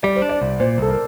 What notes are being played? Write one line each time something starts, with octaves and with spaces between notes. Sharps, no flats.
G3 D5
C5
D4
D5
C2
A#2 C5
C2 A4
A#4